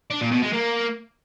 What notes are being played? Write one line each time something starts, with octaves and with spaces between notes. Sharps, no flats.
D4
A#2
B2
G#3
A#3